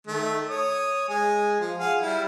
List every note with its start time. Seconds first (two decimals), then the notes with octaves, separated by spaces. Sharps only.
0.07 D#3 A3
0.49 C#5 D#6
1.09 G#3 G#5
1.60 F3
1.78 G#4 F5 F#5
2.02 G3 E4